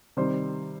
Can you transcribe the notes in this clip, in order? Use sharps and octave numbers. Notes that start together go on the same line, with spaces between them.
C3 D#3 G3 C5